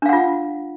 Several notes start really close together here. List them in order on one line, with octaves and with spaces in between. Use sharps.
D4 F5 F#5 F4